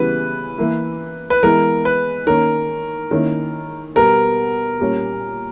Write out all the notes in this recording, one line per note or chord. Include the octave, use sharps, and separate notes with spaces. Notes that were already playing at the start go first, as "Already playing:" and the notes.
Already playing: C#3 E3 G3 B3 B4
E3 A#3 E4
B4
E3 G#3 B3 E4 A#4
B4
D#3 A#3 C#4 A#4
D#3 A#3 C#4 E4
B2 G3 B3 A#4
A#2 G3 C#4